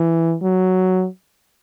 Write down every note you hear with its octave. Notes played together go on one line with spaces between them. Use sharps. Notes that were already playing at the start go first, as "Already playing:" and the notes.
Already playing: E3
F#3